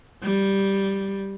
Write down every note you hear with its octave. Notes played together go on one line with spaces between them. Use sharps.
G3